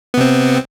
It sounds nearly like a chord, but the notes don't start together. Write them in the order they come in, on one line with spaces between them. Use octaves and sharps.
B3 C3 C4